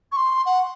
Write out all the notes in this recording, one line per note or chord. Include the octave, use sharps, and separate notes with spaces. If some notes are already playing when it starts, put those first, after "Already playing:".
C#6
C6
F#5